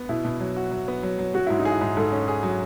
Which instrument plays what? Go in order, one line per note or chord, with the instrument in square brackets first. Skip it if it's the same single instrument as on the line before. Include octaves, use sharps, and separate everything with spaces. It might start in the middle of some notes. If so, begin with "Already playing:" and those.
Already playing: [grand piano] B3
[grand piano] B2 [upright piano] E4
[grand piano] B2
F#3
F#4
F#3
B3
F#3
F#3
[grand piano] F#3 [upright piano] F#4
[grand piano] G#2 [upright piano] E4
[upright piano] D#4
[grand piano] G#4
[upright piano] E4
[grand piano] G#2
[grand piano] G#2 [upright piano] A4
[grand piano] C#4
G#4
F#3